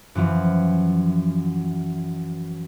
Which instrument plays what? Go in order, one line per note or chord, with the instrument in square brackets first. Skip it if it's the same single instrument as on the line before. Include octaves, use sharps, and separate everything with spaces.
[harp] F#2 E3 F3